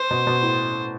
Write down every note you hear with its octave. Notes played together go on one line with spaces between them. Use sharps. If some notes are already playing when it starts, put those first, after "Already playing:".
Already playing: C5
B2
B2
A2